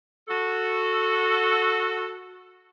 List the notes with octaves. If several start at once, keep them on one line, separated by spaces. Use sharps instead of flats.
F#4 A4